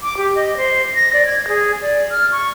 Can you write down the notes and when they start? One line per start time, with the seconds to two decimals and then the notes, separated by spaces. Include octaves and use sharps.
0.01 D6
0.17 G4
0.35 D#5
0.57 C5
0.96 A#6
1.13 D5
1.26 G#6
1.48 G#4
1.82 D5
2.11 F6
2.32 C#6